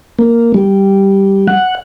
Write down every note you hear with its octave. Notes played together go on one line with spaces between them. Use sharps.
A#3
G3
F#5